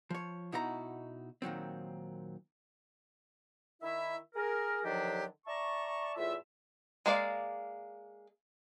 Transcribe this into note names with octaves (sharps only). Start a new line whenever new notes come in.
F3 C#5
B2 D#4 E4 F#4 C#5 A#5
A#2 D#3 F#3 C4
D#3 E4 E5
G#4 A#4
D3 D#3 F3 F#3 D4 G4
D5 E5 A5 A#5 C#6
E2 A2 F4 E5
G#3 A#3 D5 F5